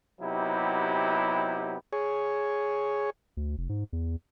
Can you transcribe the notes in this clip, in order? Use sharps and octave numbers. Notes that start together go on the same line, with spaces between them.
C3 F#3 B3 D#4 E4 G4
G#4 C#5
D2
F1
G#2
E2